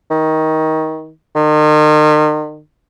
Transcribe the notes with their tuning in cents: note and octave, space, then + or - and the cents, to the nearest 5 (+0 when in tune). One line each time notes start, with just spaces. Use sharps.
D#3 +20
D#3 -40